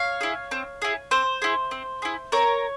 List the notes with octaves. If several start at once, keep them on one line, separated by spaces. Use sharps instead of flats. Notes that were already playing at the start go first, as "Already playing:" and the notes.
Already playing: C#5 F5
E4 G#4
C4
E4 G#4
C4 C5
E4 G#4
C4
E4 G#4
C4 A#4 C#5